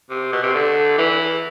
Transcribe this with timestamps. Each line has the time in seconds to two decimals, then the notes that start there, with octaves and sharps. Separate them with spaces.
0.10 C3
0.32 B2
0.43 C3
0.54 D3
0.98 E3